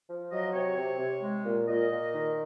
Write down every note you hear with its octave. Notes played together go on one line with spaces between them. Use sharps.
F3
F#3 D#5
C3 C#5
C3
C3
G#3
A#2
A#2 D#5
A#2
D#3